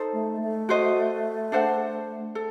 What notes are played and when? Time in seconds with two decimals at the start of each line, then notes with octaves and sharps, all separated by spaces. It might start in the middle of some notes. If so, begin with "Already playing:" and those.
Already playing: D#4 A4 C5
0.13 A3
0.41 A3
0.69 F#4 C5 D#5
1.52 D4 A4 C5 F#5
2.35 A4